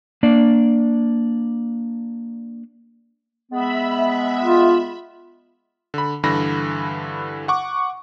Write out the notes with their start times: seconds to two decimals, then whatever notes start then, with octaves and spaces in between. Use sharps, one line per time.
0.23 A#3 D4 D5
3.52 G#3 B3 E5 B5
4.41 F4
5.94 D3 B5
6.23 G2 D3 E3 B5 A#6
7.48 F#5 C#6 D6